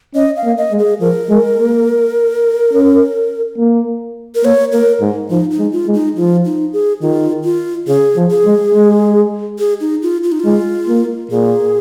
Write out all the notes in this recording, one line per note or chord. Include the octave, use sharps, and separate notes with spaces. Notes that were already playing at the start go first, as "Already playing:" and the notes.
C#4 D#5
F5
A#3
D#5
G#3
G#4
F3 A#4
G#3
A#3
C#4
A#3
A#4
A#3 C#5
A#3 A#4
G#2
F3 D#4
D#4
G#3
F4
G#3
D#4
F3 F4
D#4
G#4
D#3 F4
F4
C#3 G#4
F3
G#4
G#3
G#3
G#4
D#4
F4
F4
D#4
G#3 F4
A#3
A#2 G#4